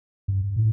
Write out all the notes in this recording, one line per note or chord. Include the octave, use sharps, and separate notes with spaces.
G2
A2